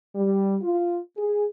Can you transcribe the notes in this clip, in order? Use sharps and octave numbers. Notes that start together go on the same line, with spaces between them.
G3
F4
G#4